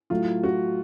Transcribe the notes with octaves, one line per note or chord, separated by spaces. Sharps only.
A2 F#3 A3 F4
F#4